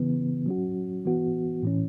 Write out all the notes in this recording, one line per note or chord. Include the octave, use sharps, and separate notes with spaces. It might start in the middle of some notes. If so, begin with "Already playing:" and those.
Already playing: C#3 E3 B3
F#3 C#4 F#4
E3 B3 F#4
A2 E3 C#4